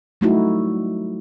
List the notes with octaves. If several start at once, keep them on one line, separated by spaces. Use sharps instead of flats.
F#3 G3 A3 D#4 E4 F#4